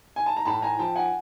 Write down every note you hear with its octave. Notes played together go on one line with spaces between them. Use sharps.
G#5
A5
A#5
A2 A5 B5
G#5 A#5
F3 G5 A5
F#5 G#5